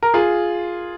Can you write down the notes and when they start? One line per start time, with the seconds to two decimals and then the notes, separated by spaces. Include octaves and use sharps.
0.03 A#4
0.14 F4 G#4